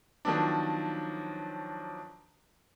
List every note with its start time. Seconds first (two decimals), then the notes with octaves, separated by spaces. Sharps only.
0.25 D#3 F3 F#3 B3 D4